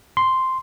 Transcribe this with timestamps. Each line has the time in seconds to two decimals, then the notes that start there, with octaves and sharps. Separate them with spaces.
0.17 C6